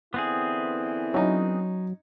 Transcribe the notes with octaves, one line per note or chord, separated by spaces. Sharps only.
D3 E3 B3 C4 E4 G#4
F#3 C#4 D#4